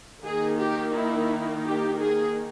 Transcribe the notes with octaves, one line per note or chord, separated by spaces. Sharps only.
D#3 A#3 D#4 G#4
G4
E4
G4
G#4